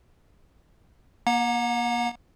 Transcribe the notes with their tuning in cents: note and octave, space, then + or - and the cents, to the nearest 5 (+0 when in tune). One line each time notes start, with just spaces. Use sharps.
A#3 +30 F#5 -35 A#5 +0